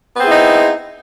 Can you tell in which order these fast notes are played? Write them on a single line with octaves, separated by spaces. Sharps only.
B3 C4 G#4 E4 D#4